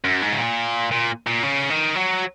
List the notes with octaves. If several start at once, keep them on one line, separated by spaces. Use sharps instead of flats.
F#2
G#2
C#3
A#2
A#2
A#2
C#3
D#3
F#3